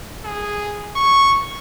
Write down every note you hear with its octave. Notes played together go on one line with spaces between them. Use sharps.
G#4
C#6